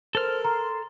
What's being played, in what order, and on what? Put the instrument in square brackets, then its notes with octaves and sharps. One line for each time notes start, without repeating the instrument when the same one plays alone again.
[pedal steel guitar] A4 F6 [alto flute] A#4 [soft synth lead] C5
[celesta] A#5 [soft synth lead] C6